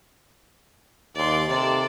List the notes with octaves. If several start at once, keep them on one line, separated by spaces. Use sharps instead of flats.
D#2 D5 C6
C3 A4 D5